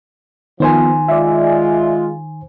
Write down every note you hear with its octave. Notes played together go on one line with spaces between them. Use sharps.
D#3 F3 B3 C5 G#5
G#3 F4 D5 E5